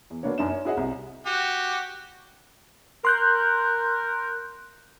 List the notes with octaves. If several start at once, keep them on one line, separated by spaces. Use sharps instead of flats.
E2
F#3 A#3 B3 D4 C#5
F#2 D4 D#4 E7
C#5
E4 F#4 G#4 C#5 D#5 F#5
C2
F#4 G4
A#4 C6 F#6 G6